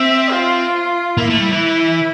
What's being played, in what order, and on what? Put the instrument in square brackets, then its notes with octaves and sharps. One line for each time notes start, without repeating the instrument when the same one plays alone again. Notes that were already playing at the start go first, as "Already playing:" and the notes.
Already playing: [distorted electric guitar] C4 [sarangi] E5
[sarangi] F4
[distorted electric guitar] A#3 [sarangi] E4
[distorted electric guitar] A3
G3
E3